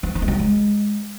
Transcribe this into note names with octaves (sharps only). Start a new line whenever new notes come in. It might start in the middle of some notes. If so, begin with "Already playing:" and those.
F3
F3
G#3
F#3
G#3